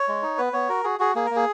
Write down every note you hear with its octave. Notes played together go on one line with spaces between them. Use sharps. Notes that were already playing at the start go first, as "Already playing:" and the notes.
Already playing: C#5
G#3
D#4
B3 B4
B3 C#5
F#4 A#4
F#4 G#4
F#4 G#4
A#3 G#4
A#3 A#4
G#4